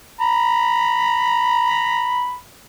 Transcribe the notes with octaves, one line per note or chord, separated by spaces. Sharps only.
A#5 B5